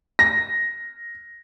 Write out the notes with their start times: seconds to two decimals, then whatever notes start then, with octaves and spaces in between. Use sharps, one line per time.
0.19 A#6